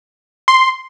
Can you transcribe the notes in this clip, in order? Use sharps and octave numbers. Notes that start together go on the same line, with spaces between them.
C6